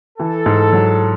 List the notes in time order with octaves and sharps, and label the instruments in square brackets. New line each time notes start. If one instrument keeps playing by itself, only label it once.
[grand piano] E3 [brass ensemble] A4
[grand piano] G#2
F#3